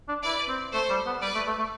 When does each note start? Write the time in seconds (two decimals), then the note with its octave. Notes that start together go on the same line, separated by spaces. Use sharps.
0.08 D4
0.24 E4 B4 D5
0.48 C4
0.73 A3 A4 C5
0.90 G3
1.06 B3
1.22 G3 B4 D5
1.35 A3
1.47 A3
1.59 A3